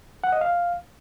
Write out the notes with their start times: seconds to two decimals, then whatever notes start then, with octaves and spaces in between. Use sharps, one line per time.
0.24 F#5
0.32 D#5
0.41 F5